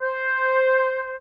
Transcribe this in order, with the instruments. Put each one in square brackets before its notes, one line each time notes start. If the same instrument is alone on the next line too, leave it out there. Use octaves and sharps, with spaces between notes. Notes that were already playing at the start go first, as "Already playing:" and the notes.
[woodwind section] C5